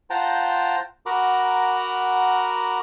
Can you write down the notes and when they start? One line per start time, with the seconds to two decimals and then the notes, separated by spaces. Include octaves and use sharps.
0.10 F4 C5 F#5 G5 A5 A#5
1.06 F#4 A#4 F#5 A#5 B5 D6